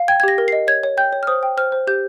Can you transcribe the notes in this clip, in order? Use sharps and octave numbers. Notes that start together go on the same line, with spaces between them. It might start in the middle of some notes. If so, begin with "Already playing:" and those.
Already playing: F5
G5 G#6
G#6
G4 A#6
A#4
D#5 C7
C#5 G#6
C#5
G5 G6
C#5
F6
C5 D#6
G5
C5 F6
C5
G4 G6